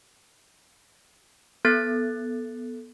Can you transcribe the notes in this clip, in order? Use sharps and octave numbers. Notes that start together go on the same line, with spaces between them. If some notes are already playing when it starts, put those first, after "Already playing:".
B3 A4 F#6 A6